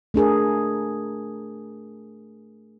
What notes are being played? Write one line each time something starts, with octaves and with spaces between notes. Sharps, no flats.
A3 D4 G#4 A#4